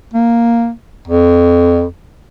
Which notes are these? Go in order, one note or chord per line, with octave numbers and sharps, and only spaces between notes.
A#3
F2